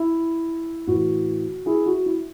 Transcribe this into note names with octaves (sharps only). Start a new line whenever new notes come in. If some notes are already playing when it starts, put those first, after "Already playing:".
Already playing: E4
A2 E3 F#4
E4 G#4
F#4
E4